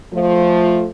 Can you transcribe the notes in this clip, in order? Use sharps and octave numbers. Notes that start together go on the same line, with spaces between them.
F3 A3